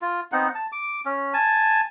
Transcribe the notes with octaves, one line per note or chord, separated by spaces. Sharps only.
F4
B3 C4 D#4 F#5
A5
D6
C#4
G#5 A5